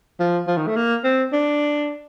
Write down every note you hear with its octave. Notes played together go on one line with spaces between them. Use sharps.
F3
F3
D#3
A3
A#3
C4
D4